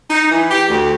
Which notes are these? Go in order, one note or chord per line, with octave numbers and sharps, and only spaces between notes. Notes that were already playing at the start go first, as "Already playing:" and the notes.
D#4
E3
G4
D2